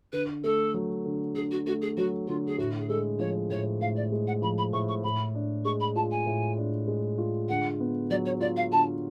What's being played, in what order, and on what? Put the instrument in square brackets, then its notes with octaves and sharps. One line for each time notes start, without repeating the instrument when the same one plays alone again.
[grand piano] D3 [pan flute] B4
[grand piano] A3 [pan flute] A4
[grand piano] F#3
D3
[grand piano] D3 [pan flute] G#4
[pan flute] F#4
[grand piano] A3 [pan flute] F#4
[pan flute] G#4
[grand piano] F#3 [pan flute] F#4
[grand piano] D3 [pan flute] F4
[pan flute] G#4
[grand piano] A2 [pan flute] F#4
[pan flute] G#4
[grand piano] G#3 [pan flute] A4
[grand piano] F3 [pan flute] C#5
[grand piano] A2 [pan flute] C#5
[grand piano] A2 [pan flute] F5
[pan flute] D5
[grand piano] G#3
[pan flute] F#5
[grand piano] F3 [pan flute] B5
[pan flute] B5
[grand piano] A2 [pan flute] C#6
[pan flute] C#6
[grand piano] A2 [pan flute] B5
[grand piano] D4
[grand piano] G#3 [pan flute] C#6
[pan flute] B5
[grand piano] F4 [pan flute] A5
[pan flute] G#5
[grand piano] A2
D4
G#3
F4
[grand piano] D3 [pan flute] F#5
[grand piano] B3
[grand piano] F#3 [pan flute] D5
[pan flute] C#5
[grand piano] F4 [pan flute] D5
[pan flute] F5
[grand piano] D3 [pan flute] A5